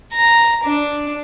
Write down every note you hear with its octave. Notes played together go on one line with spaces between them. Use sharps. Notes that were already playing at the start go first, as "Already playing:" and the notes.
A#5
D4